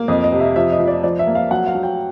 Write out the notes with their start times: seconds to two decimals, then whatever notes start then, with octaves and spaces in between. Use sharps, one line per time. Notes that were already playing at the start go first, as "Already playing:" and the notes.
Already playing: A#3
0.08 F2 D#5
0.24 D#5
0.32 C3
0.40 E5
0.56 F3 E5
0.72 D#5
0.79 F3
0.87 D5
1.03 F3 D5
1.19 E5
1.27 A#3
1.35 F5
1.51 F#3 F#5
1.67 F5
1.75 F#3
1.83 G5